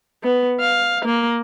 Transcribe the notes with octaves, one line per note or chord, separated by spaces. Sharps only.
B3
F5
A#3